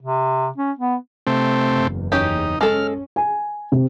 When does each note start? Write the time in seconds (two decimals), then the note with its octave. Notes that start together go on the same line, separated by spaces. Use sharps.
0.02 C3
0.57 C#4
0.79 B3
1.27 C3 A3 C4
1.68 F#1 E2
2.12 C#4 D#4 G4
2.61 G#3 C#4 A4 F6
3.16 G#5
3.72 C3